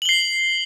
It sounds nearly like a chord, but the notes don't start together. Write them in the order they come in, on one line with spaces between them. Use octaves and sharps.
F#7 G7 C7